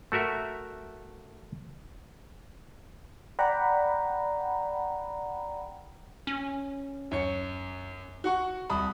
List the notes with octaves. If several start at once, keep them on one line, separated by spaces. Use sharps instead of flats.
A3 F#4 A#4 E5
D5 F#5 G5 A#5 B5
C#4
F#2 C#5 C#7
F#4 F#5 C#6
C2 B5 D#6